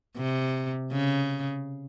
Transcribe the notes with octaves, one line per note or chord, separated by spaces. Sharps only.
C3
C#3